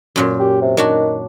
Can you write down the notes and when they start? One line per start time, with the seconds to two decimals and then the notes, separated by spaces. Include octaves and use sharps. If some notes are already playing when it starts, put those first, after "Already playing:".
0.16 F#2 A#2 F#3
0.40 G4
0.62 C3
0.77 D#3 F#3 D4 F#4